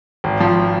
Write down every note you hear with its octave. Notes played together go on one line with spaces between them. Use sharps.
G#1
F3